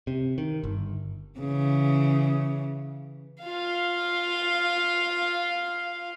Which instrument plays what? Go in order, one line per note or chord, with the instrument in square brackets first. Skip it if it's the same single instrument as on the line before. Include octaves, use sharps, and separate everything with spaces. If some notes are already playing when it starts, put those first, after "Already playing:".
[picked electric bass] C3
D#3
G1
[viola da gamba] C#3 E3
[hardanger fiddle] F4 F5